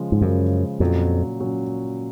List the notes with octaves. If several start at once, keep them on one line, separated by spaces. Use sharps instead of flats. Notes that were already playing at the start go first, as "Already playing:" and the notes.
Already playing: C#3 F3 G#3
G#2
F#2 C#3 F3 G#3
F2 A#2 F#3 C#4
A#2 F#3 C#4